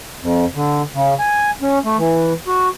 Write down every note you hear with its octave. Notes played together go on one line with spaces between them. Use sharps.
F2
D3
C#3
G#5
C#4
A3
E3
F#4